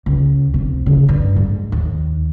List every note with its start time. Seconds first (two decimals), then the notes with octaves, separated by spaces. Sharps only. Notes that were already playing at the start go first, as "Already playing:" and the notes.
0.06 C#2
0.54 C3
0.86 C#3
1.09 G2
1.36 G#2
1.72 D#2